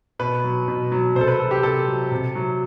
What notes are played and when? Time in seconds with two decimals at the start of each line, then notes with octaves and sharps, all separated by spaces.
0.19 B2 B4
0.44 F#3
0.68 B2
0.92 F#3
1.15 C3 C5
1.21 A4
1.28 B4
1.39 F#3 A4
1.51 G4
1.63 C3 A4
1.88 F#3
2.12 C3
2.35 F#3